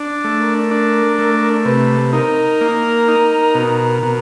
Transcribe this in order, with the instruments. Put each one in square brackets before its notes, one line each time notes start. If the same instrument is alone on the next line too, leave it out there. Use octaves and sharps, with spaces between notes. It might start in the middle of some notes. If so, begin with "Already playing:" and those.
Already playing: [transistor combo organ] D4
A3
[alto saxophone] A#4
[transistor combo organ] D4
A3
[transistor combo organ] C3 [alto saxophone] B4
[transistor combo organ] D#4 [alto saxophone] A#4
[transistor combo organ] A#3
D#4
B2
B2